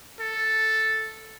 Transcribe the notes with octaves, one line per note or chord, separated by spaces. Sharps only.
A4